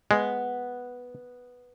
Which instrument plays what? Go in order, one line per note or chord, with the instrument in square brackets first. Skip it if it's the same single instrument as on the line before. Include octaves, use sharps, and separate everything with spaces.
[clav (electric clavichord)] G#3 [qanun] B3